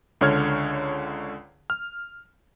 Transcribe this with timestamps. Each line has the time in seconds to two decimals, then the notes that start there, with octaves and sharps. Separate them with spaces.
0.21 C#2 D3 C#5 F6 G#6
1.70 F6